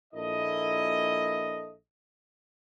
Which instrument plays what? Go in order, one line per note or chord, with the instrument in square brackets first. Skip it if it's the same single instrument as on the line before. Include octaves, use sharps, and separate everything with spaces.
[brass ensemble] A#1 A#2 E4 A4 D#5